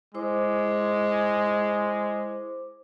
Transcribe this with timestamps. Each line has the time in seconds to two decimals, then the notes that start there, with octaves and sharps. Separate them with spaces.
0.14 G#3 E4 C5 D6